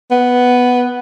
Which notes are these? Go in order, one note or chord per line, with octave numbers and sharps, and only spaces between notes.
B3